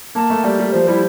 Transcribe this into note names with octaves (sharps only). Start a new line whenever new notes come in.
A#3 A5
A3
G3 D5
G3
F3 C5
G3 E4